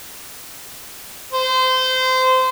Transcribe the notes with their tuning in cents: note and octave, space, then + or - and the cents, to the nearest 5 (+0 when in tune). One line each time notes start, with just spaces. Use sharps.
C5 -25